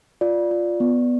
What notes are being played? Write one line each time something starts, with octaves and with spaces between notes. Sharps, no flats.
F4 D5
F4
B3